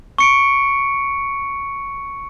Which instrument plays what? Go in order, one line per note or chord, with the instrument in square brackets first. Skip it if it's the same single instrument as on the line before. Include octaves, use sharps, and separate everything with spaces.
[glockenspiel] C#6 C#7 D7